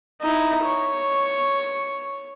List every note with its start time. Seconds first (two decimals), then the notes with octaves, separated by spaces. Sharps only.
0.21 D#4 E4
0.64 C#5